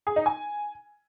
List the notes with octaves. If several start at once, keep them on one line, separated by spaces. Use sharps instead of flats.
G#4
D#4
G#5